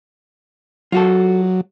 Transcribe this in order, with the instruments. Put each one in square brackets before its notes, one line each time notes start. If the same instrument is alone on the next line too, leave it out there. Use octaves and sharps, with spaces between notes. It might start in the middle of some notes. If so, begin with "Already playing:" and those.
[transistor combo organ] F#3 [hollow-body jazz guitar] F4 F#4 A4